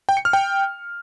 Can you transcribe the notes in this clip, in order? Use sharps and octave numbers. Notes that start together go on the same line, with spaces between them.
G5
C#7
F6
G5